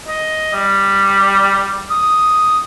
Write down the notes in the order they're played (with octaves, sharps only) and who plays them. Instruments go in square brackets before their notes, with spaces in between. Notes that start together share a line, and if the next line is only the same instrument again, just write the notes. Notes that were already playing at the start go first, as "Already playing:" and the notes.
[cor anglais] D#5
G3
[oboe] D#6